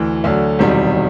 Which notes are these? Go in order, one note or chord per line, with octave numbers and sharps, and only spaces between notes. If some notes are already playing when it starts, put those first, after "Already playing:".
Already playing: D2 E3
D2 D3 F#3
E1 E2 C3 D#3 G3